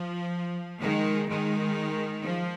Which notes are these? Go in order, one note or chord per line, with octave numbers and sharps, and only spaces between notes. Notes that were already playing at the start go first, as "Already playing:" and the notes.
Already playing: F3
D#3 G#3
D#3 G#3
F3